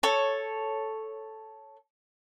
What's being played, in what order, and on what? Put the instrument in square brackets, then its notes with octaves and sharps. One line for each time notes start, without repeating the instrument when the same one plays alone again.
[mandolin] A4 C#5